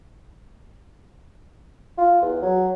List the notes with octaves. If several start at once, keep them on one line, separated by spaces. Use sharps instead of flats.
F4
E2
F#3